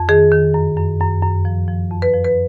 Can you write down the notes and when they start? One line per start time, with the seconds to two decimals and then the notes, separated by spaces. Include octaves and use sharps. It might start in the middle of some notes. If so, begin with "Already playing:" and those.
Already playing: F2
0.09 D#3 G#4
0.32 D#3
0.54 F#2
0.77 F#2
1.00 F#2
1.23 F#2
1.45 F3
1.68 F3
1.91 F2
2.02 B4
2.14 F3
2.24 B4